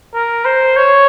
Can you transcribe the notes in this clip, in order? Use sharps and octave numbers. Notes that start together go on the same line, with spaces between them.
A#4
C5
C#5